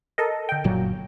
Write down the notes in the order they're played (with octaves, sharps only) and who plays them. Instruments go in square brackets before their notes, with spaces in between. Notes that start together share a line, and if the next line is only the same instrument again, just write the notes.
[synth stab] A4 A#4 D#5
D3 G5
[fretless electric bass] F#1 A#2 F#3